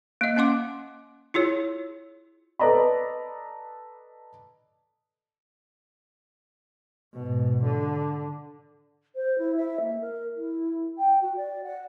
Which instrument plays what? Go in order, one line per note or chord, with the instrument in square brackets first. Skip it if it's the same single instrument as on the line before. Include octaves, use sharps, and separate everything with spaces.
[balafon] A#3 D#5
A#3 C#4 F#5 C6 D6
E4 F4 G#4 C#5
[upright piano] A4 B4 D5 D#5 A#5 B5
[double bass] G#2 B2
D3
[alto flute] C5
E4
E5
A#3
A#4
E4
G5
F#4
D5
F#5